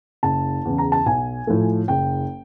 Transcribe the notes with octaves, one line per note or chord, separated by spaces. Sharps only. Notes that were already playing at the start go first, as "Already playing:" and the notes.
F#1 A5
E2 C#3
A#5
A5
B1 G#5
A2 F3 A3
F#1 G5